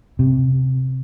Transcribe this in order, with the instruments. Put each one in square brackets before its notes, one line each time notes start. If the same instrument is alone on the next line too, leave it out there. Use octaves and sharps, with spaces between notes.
[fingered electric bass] C3